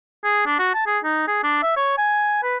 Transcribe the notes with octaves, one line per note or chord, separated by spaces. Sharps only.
G#4
D4
F#4
A5
G#4
D#4
G#4
D4
E5
C#5
G#5
B4